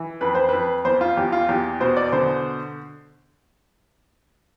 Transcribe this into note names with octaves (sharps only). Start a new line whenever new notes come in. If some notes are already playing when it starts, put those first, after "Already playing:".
Already playing: E3
F2 B4
C5
F2 B4
E2 C5
F4
E2 G4
F4
E2 G4
B2 C5
D5
D3 C5